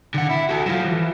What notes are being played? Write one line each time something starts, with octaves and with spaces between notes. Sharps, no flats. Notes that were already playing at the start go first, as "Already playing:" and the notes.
D3 F#5
E4
F#4 A4
F#3 F4
E3